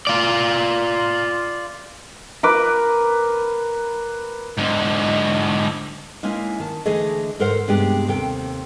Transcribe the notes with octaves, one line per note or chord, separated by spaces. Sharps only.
F4 D5
A#4 B4 D6
G#2 D3
G#3 A#3 C#4 D#4 E4 G#5
D#3 A5
D3 E3 A3 G#4 A4 D#5
G#2 A4 A#4 C5 F#5
G2 C3 G#3 B3 D4 G4
D#2 C3 A4 C5 G5